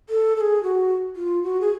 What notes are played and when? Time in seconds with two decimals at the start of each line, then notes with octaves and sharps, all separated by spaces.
0.10 A4
0.36 A4
0.41 G#4
0.63 F#4
1.16 F4
1.43 F#4
1.61 G#4